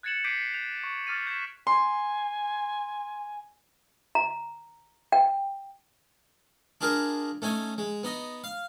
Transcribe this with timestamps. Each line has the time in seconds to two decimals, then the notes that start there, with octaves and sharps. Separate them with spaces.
0.03 F#6 G#6 A6 C#7 E7 F#7
0.24 D6 G6 B6 C7 D7 D#7
0.54 G6 F7
0.84 C#6
1.07 D6 F6 A6 D#7
1.27 G6 B6 E7
1.67 G#5 C6
4.15 A#5
5.12 G5
6.81 D4 F4 G#4 A#4
7.42 A3 C#4 D#4 G#5
7.78 G#3
8.03 B3 D#4 D#5
8.44 F5